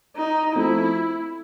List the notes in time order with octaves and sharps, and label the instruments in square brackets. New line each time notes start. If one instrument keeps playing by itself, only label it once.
[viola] D#4
[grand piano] F3 A3 C4 [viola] E4